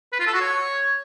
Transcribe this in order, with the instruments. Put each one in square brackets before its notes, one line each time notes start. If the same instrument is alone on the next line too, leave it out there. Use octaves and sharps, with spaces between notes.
[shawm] B4
F4
A4
F#4
C#5